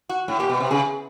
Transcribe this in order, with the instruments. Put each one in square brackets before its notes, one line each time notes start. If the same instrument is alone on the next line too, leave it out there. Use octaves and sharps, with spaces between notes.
[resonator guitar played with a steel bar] F#4
[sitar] A2
[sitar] A#2 [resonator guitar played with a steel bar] G4
[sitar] B2
C3
[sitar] C#3 [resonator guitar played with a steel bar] G#4